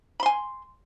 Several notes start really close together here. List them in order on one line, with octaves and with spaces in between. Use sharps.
B5 C6 G#5